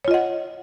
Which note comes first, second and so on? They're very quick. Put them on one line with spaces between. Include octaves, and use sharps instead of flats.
C#5 F4 D#5 F#5